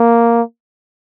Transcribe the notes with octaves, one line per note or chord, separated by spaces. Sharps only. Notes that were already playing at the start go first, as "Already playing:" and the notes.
Already playing: A#3